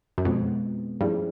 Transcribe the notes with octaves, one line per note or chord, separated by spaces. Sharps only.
F#2
F2 B2 G#3 B3
G2 F3 A3 C#4 E4 G#4